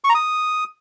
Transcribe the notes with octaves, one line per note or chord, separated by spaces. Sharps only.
C#6
A#5
D#6